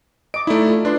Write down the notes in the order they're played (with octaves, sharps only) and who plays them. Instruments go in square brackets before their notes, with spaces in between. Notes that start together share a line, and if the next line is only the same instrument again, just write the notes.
[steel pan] D#5 D6 [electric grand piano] D7
[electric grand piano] A3 E4 [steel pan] D#4 D5
[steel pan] F4
[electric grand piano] D4 [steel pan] B4 D5 C6